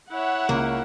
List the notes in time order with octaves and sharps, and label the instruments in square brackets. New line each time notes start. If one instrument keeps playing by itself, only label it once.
[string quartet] E4 C#5 E5 [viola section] F#5
[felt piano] C#2 [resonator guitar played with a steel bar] A#3